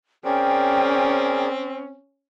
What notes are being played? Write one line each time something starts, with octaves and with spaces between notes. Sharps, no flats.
C4 C#4 G#4 A#4 D5 G5